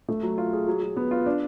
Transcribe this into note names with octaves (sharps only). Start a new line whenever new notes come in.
A3
F#3
F4
G#4
F#3
F#3
B3
F4
D4